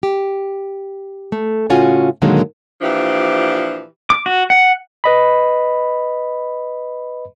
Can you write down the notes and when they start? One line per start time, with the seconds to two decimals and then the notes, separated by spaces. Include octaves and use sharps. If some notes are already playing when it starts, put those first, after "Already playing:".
0.03 G4
1.32 A3
1.70 A2 C#3 C#4 F4 F#4 G#5
2.22 A#2 D3 D#3 F#3 G#3 A#3
2.82 A#2 E3 F3 D4 G4
4.10 D6
4.26 F#4
4.50 F#5
5.04 B4 D#5 B5